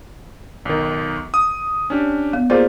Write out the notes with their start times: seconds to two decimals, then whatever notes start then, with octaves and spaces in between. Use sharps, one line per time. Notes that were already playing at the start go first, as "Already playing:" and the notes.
0.65 B1 D#3
1.34 D#6
1.90 C#4 D4 G4
2.33 B3
2.50 A#3 F4 G4 G#4 C5 D5